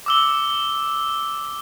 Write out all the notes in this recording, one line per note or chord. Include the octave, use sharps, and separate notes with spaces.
D6 E6 G7